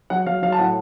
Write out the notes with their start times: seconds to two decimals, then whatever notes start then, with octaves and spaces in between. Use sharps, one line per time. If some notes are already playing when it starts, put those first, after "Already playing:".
0.10 F#3 F#5
0.26 F#3 F5
0.42 F#3 F5
0.52 A5
0.59 A2 F#5